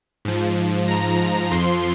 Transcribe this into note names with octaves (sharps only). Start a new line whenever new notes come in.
G#2 F3
A#5
F2 F3 C6